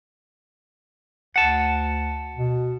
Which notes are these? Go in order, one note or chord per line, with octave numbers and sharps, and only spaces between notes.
D2 F#5 A5
B2